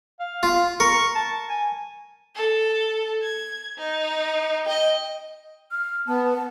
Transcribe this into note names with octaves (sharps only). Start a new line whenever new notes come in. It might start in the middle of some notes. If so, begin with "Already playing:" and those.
F5
F4
A#4 C#6
A5
G#5
A4
G#6
D#4
D#5 G5
F6
B3 A5